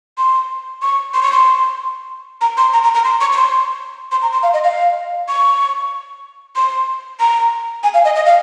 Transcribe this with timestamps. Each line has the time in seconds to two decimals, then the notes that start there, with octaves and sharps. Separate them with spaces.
0.18 C6
0.82 C#6
1.14 C6
1.22 C#6
1.32 C6
2.41 A#5
2.57 C6
2.73 A#5
2.83 A#5
2.94 A#5
3.05 C6
3.21 C#6
3.32 C#6
3.37 C6
4.12 C6
4.22 A#5
4.33 C6
4.43 F5
4.53 D#5
4.64 F5
5.28 C#6
6.56 C6
7.20 A#5
7.83 G#5
7.94 F5
8.05 D#5
8.15 D#5
8.26 F5